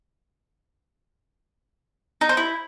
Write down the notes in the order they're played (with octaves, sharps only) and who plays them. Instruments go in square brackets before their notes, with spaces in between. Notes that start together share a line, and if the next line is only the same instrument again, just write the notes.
[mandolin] D#4
C5
E4